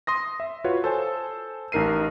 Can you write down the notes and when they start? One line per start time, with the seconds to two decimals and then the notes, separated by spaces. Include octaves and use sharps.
0.07 C6 D#6 A#6
0.40 E5
0.64 F4 F#4 B4 C#5
0.84 A4 C5 G#5
1.72 A1 D#4 A#4 C7 D#7